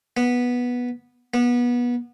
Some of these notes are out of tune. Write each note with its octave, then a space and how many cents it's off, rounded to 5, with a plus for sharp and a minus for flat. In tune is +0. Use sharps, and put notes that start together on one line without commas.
B3 -10
B3 -25